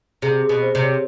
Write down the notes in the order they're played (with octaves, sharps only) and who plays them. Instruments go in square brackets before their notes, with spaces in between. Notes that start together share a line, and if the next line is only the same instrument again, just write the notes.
[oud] C3 [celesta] G#4
[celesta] G#4
[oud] B2
[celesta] C5
[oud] C3
[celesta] C#5